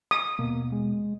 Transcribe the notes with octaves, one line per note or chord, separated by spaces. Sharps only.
D#6
D#2 B2 A#3
G#3